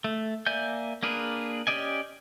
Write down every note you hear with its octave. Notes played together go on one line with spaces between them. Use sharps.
A3
A#3 D5 E5 G#5 G6
A#3 D4 G#4 A#4 B4
C#4 G4 D5 D#5 G#5